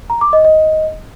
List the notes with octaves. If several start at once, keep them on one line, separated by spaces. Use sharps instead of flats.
A#5
D6
D#5
D#5